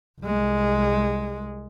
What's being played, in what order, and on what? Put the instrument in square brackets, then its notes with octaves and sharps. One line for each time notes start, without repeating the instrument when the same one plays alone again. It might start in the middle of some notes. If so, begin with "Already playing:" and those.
[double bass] C2 G#3